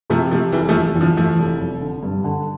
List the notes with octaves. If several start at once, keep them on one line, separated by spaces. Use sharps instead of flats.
C3 F3 A3
F3 A3 G4
F1 E3 G3
F3 A3
E2
E2
D3 F3
E2 F3 A3
F1
F1
D3
G2
D3